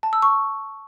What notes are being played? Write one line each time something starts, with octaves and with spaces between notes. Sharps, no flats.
A5
E6
C#6